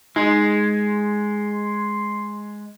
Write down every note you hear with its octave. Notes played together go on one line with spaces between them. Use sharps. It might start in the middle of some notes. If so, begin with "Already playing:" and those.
G#3 D#4 C6